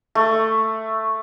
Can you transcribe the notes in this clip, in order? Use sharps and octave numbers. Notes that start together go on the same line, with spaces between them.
A3